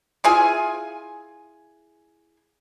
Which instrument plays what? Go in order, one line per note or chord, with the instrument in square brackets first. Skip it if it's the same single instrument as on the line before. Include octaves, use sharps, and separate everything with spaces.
[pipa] E4 F4 G#4 G#5